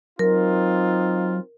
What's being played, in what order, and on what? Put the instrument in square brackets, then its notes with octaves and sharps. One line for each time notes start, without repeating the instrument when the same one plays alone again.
[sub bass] F#3 [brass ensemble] C4 D#4 F4 [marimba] A#4